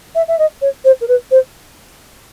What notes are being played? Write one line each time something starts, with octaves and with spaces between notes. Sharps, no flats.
E5
E5
D#5
C#5
C5
A#4
B4
C5